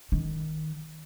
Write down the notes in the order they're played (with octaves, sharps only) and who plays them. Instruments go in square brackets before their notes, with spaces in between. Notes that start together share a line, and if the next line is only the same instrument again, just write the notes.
[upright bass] D#3